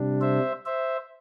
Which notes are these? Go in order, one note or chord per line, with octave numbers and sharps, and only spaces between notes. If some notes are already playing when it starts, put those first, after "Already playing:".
Already playing: C3 G3 D4
C5 E5
C5 E5